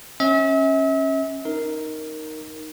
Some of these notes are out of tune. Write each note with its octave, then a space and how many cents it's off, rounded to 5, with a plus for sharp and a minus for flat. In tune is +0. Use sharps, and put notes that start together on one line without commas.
C#4 -20 E5 -40
D#4 +0 A#4 +0